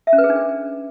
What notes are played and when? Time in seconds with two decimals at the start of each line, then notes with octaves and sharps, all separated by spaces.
0.07 E5
0.13 C#4
0.18 B4
0.24 G#4
0.30 D4